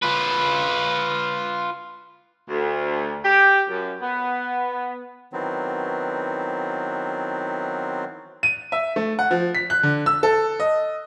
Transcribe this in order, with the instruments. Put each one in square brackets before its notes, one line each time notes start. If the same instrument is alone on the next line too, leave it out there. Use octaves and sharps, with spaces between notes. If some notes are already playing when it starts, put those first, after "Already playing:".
[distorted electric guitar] F4 B4
[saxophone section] D2
G4
F#2
B3
[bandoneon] D#3 E3 F#3 B3 C4
[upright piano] D#7
E5
A3
F#5
F3
B6
F#6
D3
E6
A4
D#5